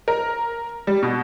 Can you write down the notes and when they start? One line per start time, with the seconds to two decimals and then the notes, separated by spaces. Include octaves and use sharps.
0.08 A#4
0.87 G3
1.03 B2